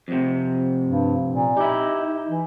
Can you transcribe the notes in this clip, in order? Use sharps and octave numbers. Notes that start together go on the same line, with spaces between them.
F2 C3
G2
A#2
D#4 E4 G4
E3